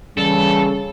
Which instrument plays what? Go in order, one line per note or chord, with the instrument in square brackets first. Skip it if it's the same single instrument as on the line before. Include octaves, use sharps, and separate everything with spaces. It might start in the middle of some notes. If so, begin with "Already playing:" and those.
[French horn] C#3 [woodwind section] E3 G3 [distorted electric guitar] A4